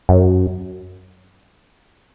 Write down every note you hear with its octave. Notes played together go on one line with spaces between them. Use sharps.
F#2